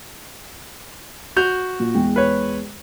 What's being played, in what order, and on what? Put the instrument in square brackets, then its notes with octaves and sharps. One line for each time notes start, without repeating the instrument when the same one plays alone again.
[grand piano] F#4 G6 F7
[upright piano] A#2
E2 G#3 G5
[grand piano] B4 C#5